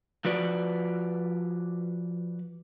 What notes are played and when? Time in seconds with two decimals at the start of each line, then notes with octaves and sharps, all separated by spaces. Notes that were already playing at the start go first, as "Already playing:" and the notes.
0.25 F3 F#4 B4 D5